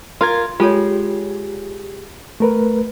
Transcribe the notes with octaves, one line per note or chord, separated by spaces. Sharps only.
F4 A#4 C6 G#6
G#3 F4 G4 A4 C#5
A3 A#4 B4